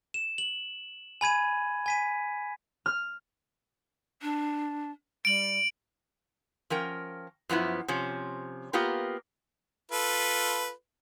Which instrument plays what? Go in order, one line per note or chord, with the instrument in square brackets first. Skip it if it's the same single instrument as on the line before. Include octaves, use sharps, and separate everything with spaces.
[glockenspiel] E7
F#7
G#5 B5 G#6 D#7
G#5 B6 D#7
[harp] F6
[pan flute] D4
[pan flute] G3 [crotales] D7 F#7
[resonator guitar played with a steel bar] F3 C#4 A#4 G5
F#2 F3 B3 E4
C3 F3 C#4
A#3 B3 F4 G4 A#4
[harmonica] F4 A4 B4